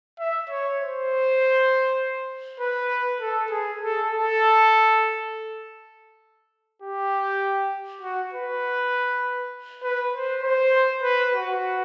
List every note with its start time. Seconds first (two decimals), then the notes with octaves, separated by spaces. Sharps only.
0.19 E5
0.50 C#5
0.80 C5
2.60 B4
3.21 A4
3.50 G#4
3.81 A4
4.10 A4
6.82 G4
8.02 F#4
8.33 B4
9.83 B4
10.14 C5
10.43 C5
11.03 B4
11.34 F#4